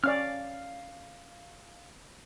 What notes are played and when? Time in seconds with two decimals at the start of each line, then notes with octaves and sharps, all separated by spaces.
0.04 C#4 D5 F5 F6